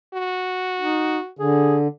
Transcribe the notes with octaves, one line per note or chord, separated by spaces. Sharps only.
F#4
D#4
D3 G#4